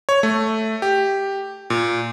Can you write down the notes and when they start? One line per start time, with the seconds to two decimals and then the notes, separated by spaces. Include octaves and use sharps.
0.09 C#5
0.23 A3
0.82 G4
1.70 A#2